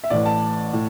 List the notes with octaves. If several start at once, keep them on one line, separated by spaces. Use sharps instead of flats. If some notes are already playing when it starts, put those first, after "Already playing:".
E5
A1 A2 E3 D5
A5
A2